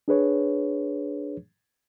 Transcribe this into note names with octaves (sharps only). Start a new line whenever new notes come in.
D4 G#4 B4 C#5